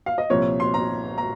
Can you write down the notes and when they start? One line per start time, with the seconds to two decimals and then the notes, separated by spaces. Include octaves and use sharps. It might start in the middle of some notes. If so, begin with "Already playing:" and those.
0.06 F5
0.18 D#5
0.30 C2 A#2 F3 C#5
0.60 C6
0.74 A#5
1.18 A#5